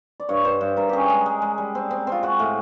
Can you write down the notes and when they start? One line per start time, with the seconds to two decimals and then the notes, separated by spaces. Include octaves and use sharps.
0.20 D5
0.29 G2 C#5
0.45 G2 C5
0.61 G2
0.77 G2 A#4
0.89 C#4 G4 G#4
1.10 G#3
1.26 G#3
1.42 G#3
1.58 G3
1.75 C4
1.91 C4
2.07 C4 F4
2.23 G#3 F#4
2.39 A2